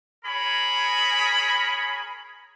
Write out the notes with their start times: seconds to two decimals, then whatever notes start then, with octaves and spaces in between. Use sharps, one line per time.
0.24 G#4 A#4 C#5 B5